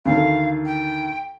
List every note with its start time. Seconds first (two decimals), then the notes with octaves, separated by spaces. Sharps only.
0.05 D2 D#3 A4 F5
0.66 G5